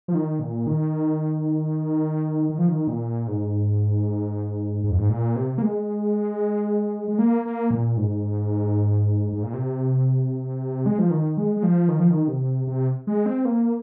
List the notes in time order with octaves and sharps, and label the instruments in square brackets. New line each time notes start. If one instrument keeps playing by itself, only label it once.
[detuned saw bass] F3
D#3
A#2
D#3
D#3
F3
D#3
A#2
G#2
G#2
F2
G#2
A#2
C3
A#3
G#3
G#3
A#3
A#3
A#2
G#2
G#2
A#2
C3
G#3
F3
D#3
G#3
G#3
F3
D#3
F3
D#3
C3
C3
G#3
C4
A#3